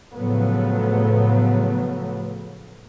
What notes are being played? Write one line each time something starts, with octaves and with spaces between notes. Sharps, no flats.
A2 C#3 F3 F#3 A3 B3